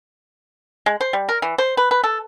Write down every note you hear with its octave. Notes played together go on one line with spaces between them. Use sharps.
G#3
C5
G3
A#4
E3
C5
B4
B4
A4